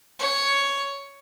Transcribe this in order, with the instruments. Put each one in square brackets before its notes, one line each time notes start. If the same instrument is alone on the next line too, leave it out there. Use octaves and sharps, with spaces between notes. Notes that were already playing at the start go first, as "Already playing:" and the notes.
[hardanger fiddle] C#5